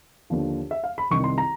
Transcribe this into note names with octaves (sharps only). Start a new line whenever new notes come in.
D#2 D3 F3
E5
F5
B5
C2 C3 D#3 C#6
C6
A#5